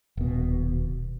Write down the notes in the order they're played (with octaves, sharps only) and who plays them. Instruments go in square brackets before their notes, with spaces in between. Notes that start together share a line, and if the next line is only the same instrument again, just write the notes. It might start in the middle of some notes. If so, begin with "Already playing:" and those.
[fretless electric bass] D#1 B2